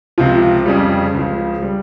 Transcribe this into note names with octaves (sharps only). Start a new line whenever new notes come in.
C#2 C3 F3 F4
F2 C#3 G3
C#2 C#3 F3
G3